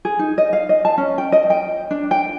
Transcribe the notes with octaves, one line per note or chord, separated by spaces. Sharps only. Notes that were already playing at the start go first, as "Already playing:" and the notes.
G#4
D#4
D#5
F5
D#5
A5
C#4
G5
D#5
G5
D4
G5